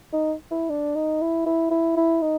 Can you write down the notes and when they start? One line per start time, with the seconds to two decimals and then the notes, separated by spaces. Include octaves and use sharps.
0.13 D#4
0.51 E4
0.70 D4
0.95 D#4
1.21 E4
1.46 E4
1.70 E4
1.97 E4
2.22 D#4